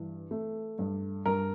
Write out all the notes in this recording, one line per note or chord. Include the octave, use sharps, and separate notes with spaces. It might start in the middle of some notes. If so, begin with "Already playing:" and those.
Already playing: G2 E3
A3
G2
G2 A#4